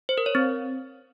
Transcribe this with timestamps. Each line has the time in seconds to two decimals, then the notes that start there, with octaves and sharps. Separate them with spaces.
0.09 C5
0.18 A#4
0.26 C#5
0.35 C4